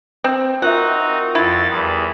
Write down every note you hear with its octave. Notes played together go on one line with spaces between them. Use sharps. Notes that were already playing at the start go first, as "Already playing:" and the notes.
C4
C4 D#4 F4 F#4 A#4 E5 F#5
F2 E4 A6
E2 G3 G#4 B5